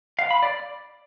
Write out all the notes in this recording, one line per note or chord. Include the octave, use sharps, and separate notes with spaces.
F5
B5
D5